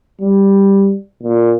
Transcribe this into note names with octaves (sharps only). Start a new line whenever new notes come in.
G3
A#2